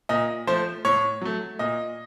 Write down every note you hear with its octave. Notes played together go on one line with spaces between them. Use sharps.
A#2 D#5
F3 A3 C5
A2 C#5
F#3 A3
A#2 D#5